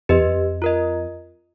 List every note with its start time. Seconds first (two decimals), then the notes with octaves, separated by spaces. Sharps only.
0.09 F2 G4 B4 D#5
0.18 E2
0.28 F2
0.62 F4 A#4 D#5